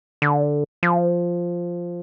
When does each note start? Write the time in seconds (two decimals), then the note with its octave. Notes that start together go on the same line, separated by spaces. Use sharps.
0.22 D3
0.83 F3